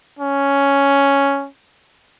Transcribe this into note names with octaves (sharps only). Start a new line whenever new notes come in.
C#4